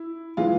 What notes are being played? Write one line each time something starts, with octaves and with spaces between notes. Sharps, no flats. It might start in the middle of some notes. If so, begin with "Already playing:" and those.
Already playing: E4
E3 G#3 F4